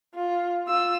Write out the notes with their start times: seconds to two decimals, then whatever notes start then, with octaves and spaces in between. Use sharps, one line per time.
0.15 F4
0.67 F4 E6